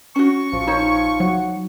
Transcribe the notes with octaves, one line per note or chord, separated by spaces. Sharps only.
C#4 F#4 C#6
A#1 F3
D#4 C#5
F#3 F#4